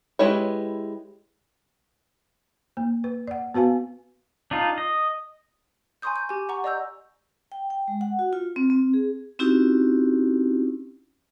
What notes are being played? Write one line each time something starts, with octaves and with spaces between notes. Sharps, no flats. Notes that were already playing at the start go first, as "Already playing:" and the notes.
G#3 E4 G4 B4 C#5
A#3
B4
D5 F#5
B3 F#4 B4 F5 G#5
D4 D#4 F4
D#5
G#5 A#5 C6 C#6 D#6 G6
G6
G4 G#5
F#5 A#5 C#6
D5 D#5 A#5 E6 G6
G5
G5
G#3
F#5
F#4
F4
C4
C4
G#4
C4 C#4 D#4 E4 F#4 G4